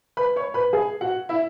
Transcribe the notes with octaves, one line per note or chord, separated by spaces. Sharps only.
B4 B5
C#5 C#6
B4 B5
G#4 G#5
F#4 F#5
E4 E5